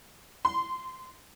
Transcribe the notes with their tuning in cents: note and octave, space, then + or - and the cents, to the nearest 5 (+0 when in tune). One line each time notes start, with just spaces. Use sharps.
C6 -15